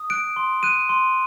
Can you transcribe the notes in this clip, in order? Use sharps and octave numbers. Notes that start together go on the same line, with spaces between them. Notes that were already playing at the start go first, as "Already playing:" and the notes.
Already playing: D#6
F#6 D7
C6
F#6 D#7
C6